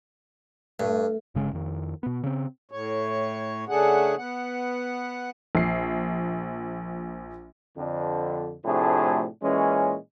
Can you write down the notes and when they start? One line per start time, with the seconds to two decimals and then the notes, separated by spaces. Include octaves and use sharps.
0.80 G2 A3
1.35 G1 C#3 G#3 C#4
1.53 F2 D#3
2.03 B2 B3
2.24 C#3 C4
2.71 A2 C#5
3.69 C#3 A3 D4 G#4 F#5
4.18 B3 F#5
5.55 A#1 C7
7.77 F2 D3
8.65 A2 C3 F3 A3 D4 G#4
9.43 A#2 E3 G#3 C#4